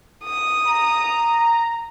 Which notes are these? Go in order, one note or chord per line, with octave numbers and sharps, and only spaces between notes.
D#6
A#5